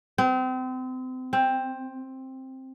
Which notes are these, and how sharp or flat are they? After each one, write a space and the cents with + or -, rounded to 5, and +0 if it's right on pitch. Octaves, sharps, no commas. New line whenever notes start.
C4 -35
C4 +10